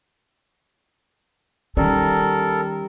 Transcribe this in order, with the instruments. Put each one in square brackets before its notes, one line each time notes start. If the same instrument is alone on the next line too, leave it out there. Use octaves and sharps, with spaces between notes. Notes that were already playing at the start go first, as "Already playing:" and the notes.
[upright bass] D#3 C#4 [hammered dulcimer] G3 [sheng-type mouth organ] A4 A#4